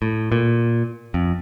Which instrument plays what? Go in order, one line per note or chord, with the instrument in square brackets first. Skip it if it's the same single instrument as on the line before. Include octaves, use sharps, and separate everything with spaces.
[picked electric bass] A2
A#2
F2